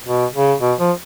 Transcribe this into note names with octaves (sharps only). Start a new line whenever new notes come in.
B2
C#3
B2
F3